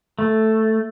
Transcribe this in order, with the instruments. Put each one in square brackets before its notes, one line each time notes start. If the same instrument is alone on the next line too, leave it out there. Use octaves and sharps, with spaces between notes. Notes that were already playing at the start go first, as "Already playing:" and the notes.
[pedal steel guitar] A3